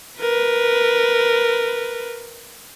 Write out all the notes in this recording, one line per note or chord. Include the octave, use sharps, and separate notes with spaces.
A#4 B4